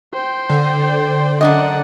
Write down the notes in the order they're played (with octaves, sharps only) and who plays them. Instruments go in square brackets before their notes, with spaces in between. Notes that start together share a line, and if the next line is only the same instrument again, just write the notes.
[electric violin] C5 G5
[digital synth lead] D3
[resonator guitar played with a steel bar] F#2 D4 D#5 [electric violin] D5 F#5